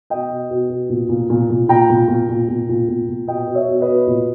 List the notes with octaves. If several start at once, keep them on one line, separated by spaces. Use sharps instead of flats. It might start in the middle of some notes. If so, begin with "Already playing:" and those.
B2 D#5 G5
B2
B2
B2
A#2
A#2
A#2
A#2
A#2 G5 A#5
A#2
A#2
A#2
A#2
A#2
A#2
A#2
B2 D#5 G5
B2
C#5 E5
B2
B4 D#5
B2
A#2